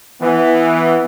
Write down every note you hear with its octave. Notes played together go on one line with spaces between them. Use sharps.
E3 B3